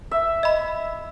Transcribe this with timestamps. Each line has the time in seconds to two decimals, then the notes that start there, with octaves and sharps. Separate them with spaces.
0.11 E5
0.43 D#5 B5